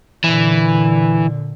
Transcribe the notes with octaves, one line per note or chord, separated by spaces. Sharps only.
A#2 D3 E3